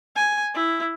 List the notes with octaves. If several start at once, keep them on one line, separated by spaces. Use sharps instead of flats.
G#5
E4